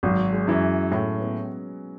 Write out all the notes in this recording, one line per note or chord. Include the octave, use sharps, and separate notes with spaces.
G#1 F#3
G#3
F#2 E3
A2 C#4
B3